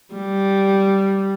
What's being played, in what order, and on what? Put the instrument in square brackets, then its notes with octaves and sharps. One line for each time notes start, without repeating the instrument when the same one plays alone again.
[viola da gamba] G3